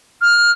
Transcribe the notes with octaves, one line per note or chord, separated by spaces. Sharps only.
F6